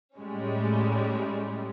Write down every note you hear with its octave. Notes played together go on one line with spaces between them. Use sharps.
A2 G3 G#3 C#4